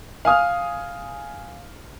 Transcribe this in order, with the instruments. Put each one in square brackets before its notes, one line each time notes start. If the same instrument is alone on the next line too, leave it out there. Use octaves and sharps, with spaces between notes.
[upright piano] F5 G#5 D#6 F6